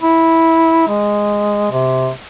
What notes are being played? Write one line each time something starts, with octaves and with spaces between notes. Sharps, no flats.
E4
G#3
C3